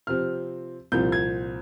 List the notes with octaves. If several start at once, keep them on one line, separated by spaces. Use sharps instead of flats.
C3 F3 C4 F6
C2 A#2 F3 C4 G6
G#6